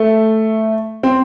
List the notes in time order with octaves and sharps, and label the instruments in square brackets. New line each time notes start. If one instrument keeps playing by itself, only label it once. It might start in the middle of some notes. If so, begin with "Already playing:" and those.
Already playing: [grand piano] A3
C4